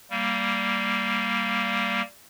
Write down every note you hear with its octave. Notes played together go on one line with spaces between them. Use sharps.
G3 A#3